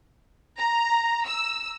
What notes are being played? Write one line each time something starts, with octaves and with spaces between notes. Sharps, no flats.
A#5
E6